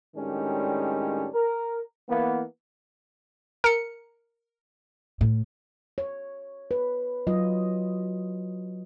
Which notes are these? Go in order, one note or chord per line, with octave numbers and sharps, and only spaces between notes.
A2 D#3 G3 G#3 C#4 D4
A#4
E3 A#3 B3
A#4 C#7
A2
C#5
B4
F#3 F4 D#5